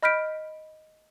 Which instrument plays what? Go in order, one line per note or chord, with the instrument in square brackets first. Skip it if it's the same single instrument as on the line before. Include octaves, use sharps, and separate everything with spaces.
[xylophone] D#5 B5 F6 G6 B6 D7